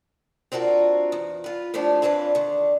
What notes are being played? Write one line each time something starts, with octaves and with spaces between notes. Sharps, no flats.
C4 D4 F4 F#4 A#4
E2
F4 B4
A2 F3 G3 A3 D4
F2 C3 C#4 D4 B4 F5
D3 D#3